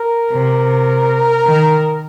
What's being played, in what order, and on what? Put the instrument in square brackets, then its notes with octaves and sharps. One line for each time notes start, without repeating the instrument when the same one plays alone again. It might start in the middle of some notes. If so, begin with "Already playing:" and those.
Already playing: [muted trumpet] A#4
[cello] C3
D#3